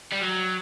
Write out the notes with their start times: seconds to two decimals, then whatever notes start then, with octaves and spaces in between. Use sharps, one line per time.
0.12 G3
0.22 F#3